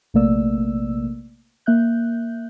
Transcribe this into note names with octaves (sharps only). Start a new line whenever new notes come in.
A#1 C3 A3 A#3 D5 E6
A#3 E5 F#6 G6